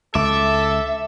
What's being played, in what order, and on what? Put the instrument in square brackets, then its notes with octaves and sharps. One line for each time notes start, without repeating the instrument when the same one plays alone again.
[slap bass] C#2 [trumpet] A4 [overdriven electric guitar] E5 [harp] D6